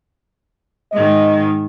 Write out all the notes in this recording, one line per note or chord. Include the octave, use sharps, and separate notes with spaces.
G#2 D#3 D#5